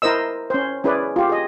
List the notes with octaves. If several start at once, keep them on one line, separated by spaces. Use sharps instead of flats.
E4 A#4 C5 D#5 E6
C#4 C5
C#4 E4 G#4 B4 D5
F4 G4
G#4 D#5